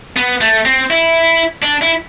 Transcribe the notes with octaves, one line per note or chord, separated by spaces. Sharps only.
B3
A3
C4
E4
D4
E4